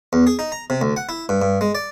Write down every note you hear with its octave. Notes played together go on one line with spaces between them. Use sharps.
E2
G#4
D#4
A#5
C3
D2
F#5
E4
G2
G2
G#3
D5